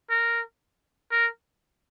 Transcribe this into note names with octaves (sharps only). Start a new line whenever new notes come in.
A#4
A#4